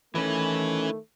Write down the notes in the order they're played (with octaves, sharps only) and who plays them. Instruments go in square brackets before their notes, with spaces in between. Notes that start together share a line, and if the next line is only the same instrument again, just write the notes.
[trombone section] D#3 A3 [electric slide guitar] E3 C#4 [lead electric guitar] E4 B4